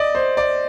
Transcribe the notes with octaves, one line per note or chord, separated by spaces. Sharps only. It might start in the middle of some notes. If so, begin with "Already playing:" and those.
Already playing: D5 D#5
C5
D5